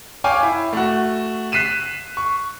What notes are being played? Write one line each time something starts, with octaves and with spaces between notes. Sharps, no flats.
C#5 F5 G5 G#5 D6
E4
A3 F#4
F#6 B6 C7 D#7 E7
C#6